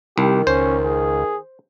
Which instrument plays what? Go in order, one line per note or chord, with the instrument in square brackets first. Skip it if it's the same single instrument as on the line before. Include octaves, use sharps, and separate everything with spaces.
[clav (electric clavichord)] C2 [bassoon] D#3 [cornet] G4
[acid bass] C#2 [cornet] C#4 [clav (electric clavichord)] C5
[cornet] G#4